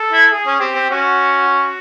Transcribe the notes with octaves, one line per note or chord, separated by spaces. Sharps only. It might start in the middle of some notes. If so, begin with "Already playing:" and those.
Already playing: A4
E4
G#4
C#4
C4 G4
C4
C#4 F#4
F#4